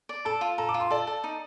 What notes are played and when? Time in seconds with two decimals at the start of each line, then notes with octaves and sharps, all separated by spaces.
0.09 D5
0.25 A4 A5
0.41 F4
0.58 A4 A#5
0.69 D6
0.74 F4
0.80 C6
0.90 A4 D5
1.07 A4
1.24 D#4